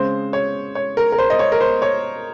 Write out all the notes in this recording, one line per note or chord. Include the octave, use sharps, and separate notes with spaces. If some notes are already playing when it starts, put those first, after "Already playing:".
Already playing: C#3 G#3 C4 C5
C#5
C#5
A#4
A#4
C5
D#5
C#5
A#4
C5
C#5